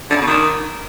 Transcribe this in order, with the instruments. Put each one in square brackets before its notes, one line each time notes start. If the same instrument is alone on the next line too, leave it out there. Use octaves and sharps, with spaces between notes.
[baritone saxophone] D3
C#3
B2
D#3